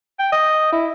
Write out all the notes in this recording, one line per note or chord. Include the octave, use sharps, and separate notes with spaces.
G5
D#5
E4